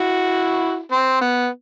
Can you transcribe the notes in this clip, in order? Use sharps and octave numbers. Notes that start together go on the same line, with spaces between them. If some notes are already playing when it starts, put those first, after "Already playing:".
Already playing: E4 F#4
C4
B3